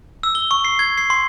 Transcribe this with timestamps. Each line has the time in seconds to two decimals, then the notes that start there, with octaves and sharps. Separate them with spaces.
0.23 E6
0.35 G7
0.51 C#6
0.64 C7
0.79 G#6
0.98 C7
1.10 C6